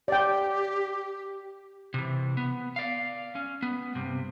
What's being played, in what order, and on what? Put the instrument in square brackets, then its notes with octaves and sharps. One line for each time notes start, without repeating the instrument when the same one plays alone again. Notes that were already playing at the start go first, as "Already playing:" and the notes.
[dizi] G4 [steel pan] D5 G5
[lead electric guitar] C3 E3
B3
D5 F5
C#4
B3
G2 C3